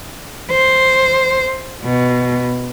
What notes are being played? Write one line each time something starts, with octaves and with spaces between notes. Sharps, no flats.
C5
B2